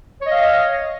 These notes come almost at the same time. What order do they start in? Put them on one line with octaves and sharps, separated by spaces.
C#5 D#5 F5